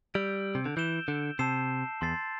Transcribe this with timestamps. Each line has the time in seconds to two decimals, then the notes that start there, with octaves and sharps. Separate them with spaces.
0.14 G3 E6 G6 D7
0.55 C3
0.65 D3
0.77 E3 G6 E7 G7
1.08 D3
1.39 C3 A5 E6 C7 E7
2.01 E2 C6 A6 C7